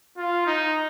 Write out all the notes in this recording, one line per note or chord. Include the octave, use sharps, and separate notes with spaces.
F4
D#4